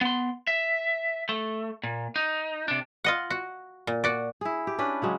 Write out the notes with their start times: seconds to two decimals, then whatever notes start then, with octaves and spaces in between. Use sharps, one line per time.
0.01 B3 C6
0.47 E5
1.29 A3
1.83 A#2
2.16 D#4
2.68 C3 D4
3.04 F4 D#5 F#5
3.30 F#4
3.87 A#2
4.04 F#4 D5
4.41 E4 G#4
4.67 G4
4.79 C#4 D4 B4
5.02 C#3 F#3 G#3